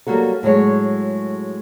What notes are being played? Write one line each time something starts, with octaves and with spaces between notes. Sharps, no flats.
F#3 G3 A#3 F#4 A4
A2 F#3 G#3 C#5